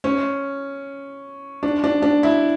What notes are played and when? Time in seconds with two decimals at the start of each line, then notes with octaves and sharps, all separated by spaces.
0.04 C#4
1.63 D4
1.84 D4
2.02 D4
2.23 E4